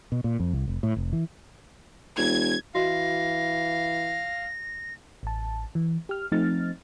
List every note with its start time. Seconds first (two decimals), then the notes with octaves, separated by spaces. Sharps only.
0.12 B2
0.24 A#2
0.40 F2
0.53 C2
0.67 F1
0.83 A2
0.96 F1
1.13 E3
2.17 E1 G#6
2.75 E3 F#4 D#5 F5 A#6
5.23 A1 A5
5.75 E3
6.09 G4 F6
6.32 F3 A3 C4 D#4 F6 A6